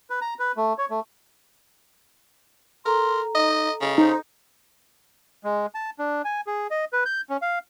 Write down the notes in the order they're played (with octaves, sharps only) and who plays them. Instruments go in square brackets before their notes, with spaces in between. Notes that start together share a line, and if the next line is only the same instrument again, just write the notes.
[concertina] B4
A#5
B4
A3
C#5
A3
[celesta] A4 A#5 [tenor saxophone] A#4 [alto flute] C6
[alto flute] D#4 [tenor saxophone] D#5
[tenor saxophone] C#3 [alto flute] D#5
[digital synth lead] D#4 [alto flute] C5
[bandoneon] G#3
A5
D4
G#5
G#4
D#5
B4
G6
C#4
F5